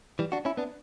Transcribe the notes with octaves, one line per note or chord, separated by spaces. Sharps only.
E3 G3
D4 F#4
C#4 E4
B3 D4